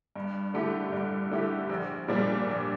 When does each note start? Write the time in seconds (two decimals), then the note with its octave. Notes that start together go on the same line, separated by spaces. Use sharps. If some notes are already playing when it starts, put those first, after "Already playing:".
0.16 G2
0.54 D3 A3 E4 G4
0.92 G2
1.31 D3 A3 E4 G4
1.69 A#1
2.08 A#2 G3 D4
2.47 A#1